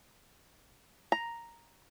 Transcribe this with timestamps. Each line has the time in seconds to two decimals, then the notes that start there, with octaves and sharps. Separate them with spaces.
1.12 A#5